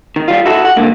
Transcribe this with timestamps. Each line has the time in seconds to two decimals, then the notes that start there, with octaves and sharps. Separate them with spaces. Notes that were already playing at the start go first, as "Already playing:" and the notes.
0.16 D#3
0.28 G3 F4
0.46 E4 F#4 A4
0.65 F#5
0.77 G2 D3 A#3